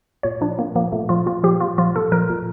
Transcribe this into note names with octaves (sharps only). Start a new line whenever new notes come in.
A#2 C#5
F3 D4
A#2 A#3
F3 A#3
A#2 A3
F3 F4
A#2 F4
F3 G4
A#2 F4
F3 F4
A#2 A4
F3 A#4
A#2